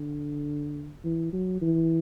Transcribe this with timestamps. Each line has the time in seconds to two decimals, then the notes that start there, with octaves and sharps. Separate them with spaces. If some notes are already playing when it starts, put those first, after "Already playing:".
Already playing: D3
1.05 E3
1.33 F#3
1.62 E3